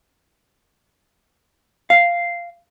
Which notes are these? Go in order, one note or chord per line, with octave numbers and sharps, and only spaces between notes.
F5